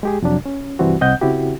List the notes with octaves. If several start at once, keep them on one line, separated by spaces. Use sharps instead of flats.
G#3 G4 G#4
F2 C3 F#3 D4
C#4
C2 G2 E3 G3 C4 F#4
C2 C4 D#5 F#5 G6
C#3 C4 E4 F#4 G4